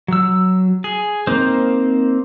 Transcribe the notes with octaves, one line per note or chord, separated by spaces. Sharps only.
F#3 E6
G#4
A#3 C4 D#4 C5